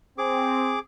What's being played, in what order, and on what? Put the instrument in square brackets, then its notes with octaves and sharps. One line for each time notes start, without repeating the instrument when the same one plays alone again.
[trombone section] C4 [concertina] G#4 D6